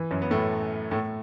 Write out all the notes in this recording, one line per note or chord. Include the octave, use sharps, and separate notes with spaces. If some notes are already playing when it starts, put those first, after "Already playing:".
Already playing: E3
F#2 F#3
B3
A2 A3
A2 A3